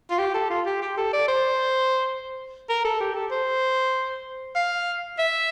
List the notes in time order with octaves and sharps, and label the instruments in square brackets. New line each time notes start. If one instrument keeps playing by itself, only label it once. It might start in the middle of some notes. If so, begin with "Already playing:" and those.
[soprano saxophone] F4
G4
A4
F4
G4
G4
A4
D5
C5
A#4
A4
G4
A4
C5
F5
E5